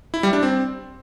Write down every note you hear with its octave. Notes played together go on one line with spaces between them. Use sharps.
E4
G3
D4
C4